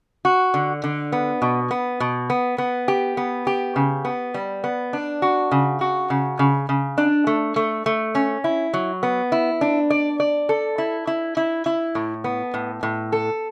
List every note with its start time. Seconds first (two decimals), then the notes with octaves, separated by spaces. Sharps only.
0.25 F#4
0.54 D3
0.84 D3
1.12 B3
1.42 B2
1.71 B3
2.00 B2
2.30 B3
2.58 B3
2.88 G4
3.17 B3
3.47 G4
3.76 C#3
4.05 B3
4.34 G3
4.64 B3
4.93 D4
5.22 F#4
5.52 C#3
5.81 F#4
6.10 C#3
6.39 C#3
6.69 C#3
6.98 D4
7.27 A3
7.56 A3
7.86 A3
8.15 C#4
8.44 E4
8.74 F#3
9.03 B3
9.32 E4
9.61 D4
9.90 D5
10.20 D5
10.49 A4
10.78 E4
11.07 E4
11.37 E4
11.66 E4
11.95 A2
12.24 B3
12.54 A2
12.83 A2
13.12 A4